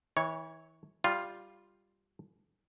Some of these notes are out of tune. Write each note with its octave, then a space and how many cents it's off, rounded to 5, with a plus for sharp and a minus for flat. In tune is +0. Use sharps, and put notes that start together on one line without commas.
E3 -35 C#5 +0
G3 +0 F4 +0